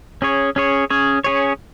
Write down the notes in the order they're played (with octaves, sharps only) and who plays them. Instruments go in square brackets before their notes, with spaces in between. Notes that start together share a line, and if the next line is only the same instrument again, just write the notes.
[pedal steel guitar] C#4 G#4 C#5
C#4 G#4 C#5
C#4 G#4 C#5
C#4 G#4 C#5